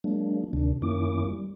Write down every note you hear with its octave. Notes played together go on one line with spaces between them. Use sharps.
F#3 G#3 A#3 D4
D2 C3 D#3 D4
F#2 D#3 A#3 C#4 E4 D6
G3